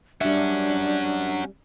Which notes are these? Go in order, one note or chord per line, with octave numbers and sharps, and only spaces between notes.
G3 C#4 D4 F#4 E5